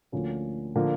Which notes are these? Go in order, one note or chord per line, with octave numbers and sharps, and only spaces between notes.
D2 D3 F3 A#3 C#4
D3 F3 A#3